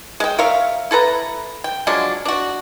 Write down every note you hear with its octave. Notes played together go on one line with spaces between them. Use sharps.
G#3 G5
A#4 C#5 E5 F5
E4 A4 B4 A#5
G5
F3 F#3 G#3 D4
D4 F#4